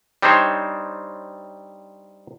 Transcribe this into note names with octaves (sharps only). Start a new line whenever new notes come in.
G3 C4 D4 D#4 C5 C#5